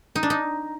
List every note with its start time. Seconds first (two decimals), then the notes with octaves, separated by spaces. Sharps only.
0.16 D#4
0.23 D4
0.30 D#4